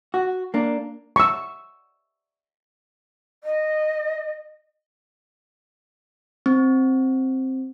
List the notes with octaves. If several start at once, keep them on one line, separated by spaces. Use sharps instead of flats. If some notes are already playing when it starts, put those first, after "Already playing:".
F#4
A#3 D4
C#6 E6
D#5
C4